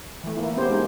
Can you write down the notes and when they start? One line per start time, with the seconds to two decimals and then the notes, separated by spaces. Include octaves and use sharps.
0.24 E3 A3
0.37 A#3 E4
0.57 B3 C#4 G4 C5
0.69 G#3 A#3 D#4 G4 A#4 C5